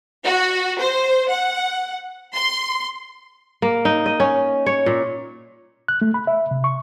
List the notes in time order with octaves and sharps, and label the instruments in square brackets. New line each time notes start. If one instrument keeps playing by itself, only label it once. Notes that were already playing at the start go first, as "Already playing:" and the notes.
[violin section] F#4
C5
F#5
C6
[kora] A#3
D#4
D#5
C#4
C#5
A#2
[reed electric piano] F#6
A3
B5
E5
C3
C#6